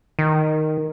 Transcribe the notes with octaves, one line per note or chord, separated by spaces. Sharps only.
D#3